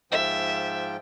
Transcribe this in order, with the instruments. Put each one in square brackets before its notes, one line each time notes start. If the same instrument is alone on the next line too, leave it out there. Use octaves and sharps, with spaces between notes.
[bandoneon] G#2 F3 G5 [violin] E5